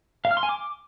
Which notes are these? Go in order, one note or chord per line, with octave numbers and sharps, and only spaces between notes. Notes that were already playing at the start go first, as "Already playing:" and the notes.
F5
F6
C6
G#5
D6